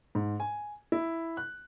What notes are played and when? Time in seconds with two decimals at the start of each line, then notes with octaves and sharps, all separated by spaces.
0.15 G#2
0.40 G#5
0.92 E4
1.37 F#6